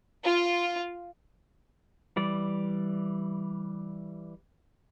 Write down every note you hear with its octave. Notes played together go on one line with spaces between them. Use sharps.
F4
E3 G3 D5